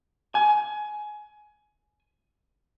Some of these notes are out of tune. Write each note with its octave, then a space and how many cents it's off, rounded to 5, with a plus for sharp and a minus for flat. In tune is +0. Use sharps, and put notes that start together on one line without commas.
G#5 +20